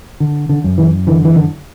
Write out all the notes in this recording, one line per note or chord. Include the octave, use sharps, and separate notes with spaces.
D3
D3
F#2
E3
D3 E3
E3
D3